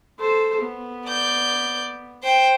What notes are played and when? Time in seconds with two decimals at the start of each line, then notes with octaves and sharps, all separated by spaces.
0.20 A4 C5
0.62 B3
1.07 D5 G6
2.23 C5 G5